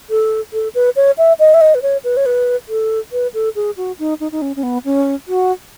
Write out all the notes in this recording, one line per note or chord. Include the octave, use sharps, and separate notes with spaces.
A4
A4
B4
C#5
E5
D#5
E5
D#5
B4
C#5
B4
C#5
B4
A4
B4
A4
G#4
F#4
D#4
D#4
D#4
C#4
C#4
B3
C#4
F#4